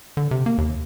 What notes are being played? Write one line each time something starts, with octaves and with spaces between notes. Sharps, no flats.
D3
C3
A#3
D#2